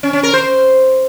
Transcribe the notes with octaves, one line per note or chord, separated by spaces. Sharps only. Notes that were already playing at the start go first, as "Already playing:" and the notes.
C#4
C#4
A#4
C5